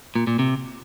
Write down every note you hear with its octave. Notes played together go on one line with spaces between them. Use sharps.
A#2
A#2
C3